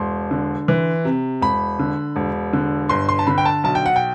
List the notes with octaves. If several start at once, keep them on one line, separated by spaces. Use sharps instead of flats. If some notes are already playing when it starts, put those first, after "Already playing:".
Already playing: E1 C6
D3
E3
C3
E1 B5
D3
E1
D3
G1 C6
C6
A5
D3 B5
G5
A5
B1 A5
G5
F#5
G5